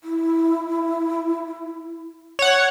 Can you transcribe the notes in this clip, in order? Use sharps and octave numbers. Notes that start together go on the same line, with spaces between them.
E4
C#5 F#5